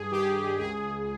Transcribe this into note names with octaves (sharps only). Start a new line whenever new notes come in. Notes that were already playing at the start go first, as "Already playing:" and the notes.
Already playing: G2 G#4
D#3 G4
C#2 G#4